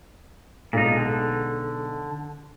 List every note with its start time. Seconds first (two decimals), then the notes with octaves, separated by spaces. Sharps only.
0.73 B1 A#2 G#3 D#4 A#5
0.96 D3